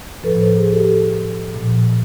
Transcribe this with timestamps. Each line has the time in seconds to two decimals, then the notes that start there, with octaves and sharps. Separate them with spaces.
0.24 A2 F3 A4 B4
0.40 A#4 C5
0.57 G#4 A#4
0.73 G4 A4
1.54 A#2 F3